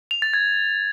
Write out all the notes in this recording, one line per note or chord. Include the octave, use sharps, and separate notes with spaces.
F7
A6
G#6